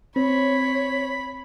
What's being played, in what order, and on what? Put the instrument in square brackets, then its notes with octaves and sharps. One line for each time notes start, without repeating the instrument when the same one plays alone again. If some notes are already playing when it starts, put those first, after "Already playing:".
[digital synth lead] C4 [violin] C#5 [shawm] B5